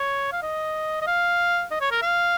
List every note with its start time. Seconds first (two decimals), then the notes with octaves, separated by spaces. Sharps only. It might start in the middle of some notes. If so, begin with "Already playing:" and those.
Already playing: C#5
0.32 F5
0.42 D#5
1.01 D#5
1.07 F5
1.71 D#5
1.80 C#5
1.91 A#4
2.02 F5